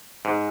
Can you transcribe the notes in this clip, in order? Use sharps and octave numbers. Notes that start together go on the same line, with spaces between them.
G#2